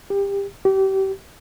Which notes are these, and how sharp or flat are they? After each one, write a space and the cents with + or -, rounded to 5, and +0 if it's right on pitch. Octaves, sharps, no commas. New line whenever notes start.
G4 +25
G4 -30